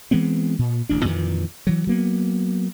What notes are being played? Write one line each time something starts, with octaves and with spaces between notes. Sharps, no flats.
E3 G#3 B3 C4
A#2
D1 A1 D4
F2 A#2 D#3 E3
E3 F#3
F#3 A#3 B3